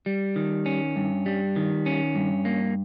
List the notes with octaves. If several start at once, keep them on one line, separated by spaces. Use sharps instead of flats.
G3
D#3
C#4
G2
G3
D#3
C#4
G2
A#3